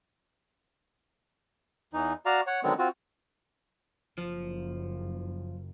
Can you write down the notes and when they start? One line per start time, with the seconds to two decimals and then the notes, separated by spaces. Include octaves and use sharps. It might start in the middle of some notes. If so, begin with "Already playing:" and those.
1.93 E2 E3 D#4
2.26 F#4 D5 F5 A#5
2.47 C#5 F#5
2.63 D3 D#3 F#3 G#3 B3 C4
2.79 C4 F4 F#4
4.18 F#1 F3